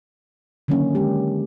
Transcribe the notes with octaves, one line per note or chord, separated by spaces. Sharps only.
D3 D#3 F#3 A#3 C#4 D4
G#3 G4